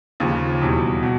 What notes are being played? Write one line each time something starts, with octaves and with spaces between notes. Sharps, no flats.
D#2 C#3 F3
E2 B2 G3
B2